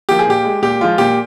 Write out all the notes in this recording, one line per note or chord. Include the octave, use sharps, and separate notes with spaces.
F3 A#3 G4
G#4
A#2 G4
G#3
A#2 G4
F3 G#3 F4
A#2 G4